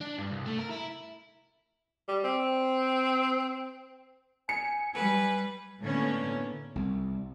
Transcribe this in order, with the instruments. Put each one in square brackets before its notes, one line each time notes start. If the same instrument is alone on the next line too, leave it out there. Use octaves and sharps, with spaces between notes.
[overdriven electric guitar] D4
G2
C2
A3
A#4
E4
[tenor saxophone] G3
C4
[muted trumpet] G#5 [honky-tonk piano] C#7
[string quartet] G3 B4 [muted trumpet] G#5
[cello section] A2 D3 A#3 B3 C#4
[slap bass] C2